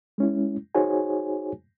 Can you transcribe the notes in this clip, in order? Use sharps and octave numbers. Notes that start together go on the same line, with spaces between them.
G#3 C#4 E4
D#4 F#4 G#4 C5 C#5 G#5